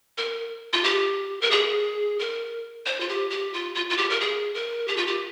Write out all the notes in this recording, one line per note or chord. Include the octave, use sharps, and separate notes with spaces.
A#4
F4
G4
A#4
G#4
A#4
C5
F4
G4
G4
F4
F4
F4
G4
A#4
G#4
A#4
G4
F4
G4